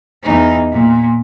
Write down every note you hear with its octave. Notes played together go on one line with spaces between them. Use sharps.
E2 D#4
A#2